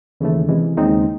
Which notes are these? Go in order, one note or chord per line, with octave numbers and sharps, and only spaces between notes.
D#2 C#3 E3 A3
C3 E3 G#3
D#2 C#3 G#3 C4 D#4